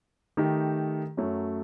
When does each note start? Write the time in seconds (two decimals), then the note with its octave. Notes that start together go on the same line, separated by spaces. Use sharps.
0.37 D#3 A3 D#4 G4
1.17 F#2 F#3 A3